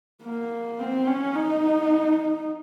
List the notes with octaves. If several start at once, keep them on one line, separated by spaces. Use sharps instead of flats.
A#3
C4
C#4
D#4